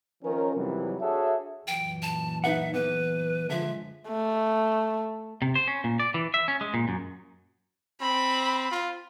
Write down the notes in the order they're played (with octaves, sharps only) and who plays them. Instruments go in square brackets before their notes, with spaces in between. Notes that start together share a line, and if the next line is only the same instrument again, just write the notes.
[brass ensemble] D#3 F3 C#4 A#4
F2 C3 E3 F#3 G3
D4 F#4 G#4 A4 C#5 E5
[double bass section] F#2 A#2 E3 [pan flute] G5
[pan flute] A5
[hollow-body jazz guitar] D#4 B4 F#5 [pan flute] E5
[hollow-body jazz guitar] E2 [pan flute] B4
[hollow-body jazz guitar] D3 F3 [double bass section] G#3 [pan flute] E5
[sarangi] A3
[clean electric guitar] C3
C5
C#4
A#2
D5
E3
E5
C#4
G#3
A#2
F#2
[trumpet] C4 [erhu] B5
[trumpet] F4